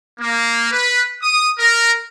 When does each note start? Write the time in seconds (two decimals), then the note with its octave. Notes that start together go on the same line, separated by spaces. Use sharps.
0.20 A#3
0.71 B4
1.23 D#6
1.59 A#4